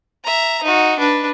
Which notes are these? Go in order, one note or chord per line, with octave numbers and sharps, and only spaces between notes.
E5 A#5
D#4 F#4
D4 B4